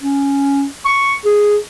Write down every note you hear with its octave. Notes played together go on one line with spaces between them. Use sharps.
C#4
C#6
G#4